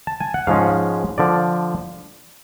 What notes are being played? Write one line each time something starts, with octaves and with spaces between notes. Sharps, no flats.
A5
G#5
F#5
G#2 F3 G#3 C#4 F5
D3 F3 D5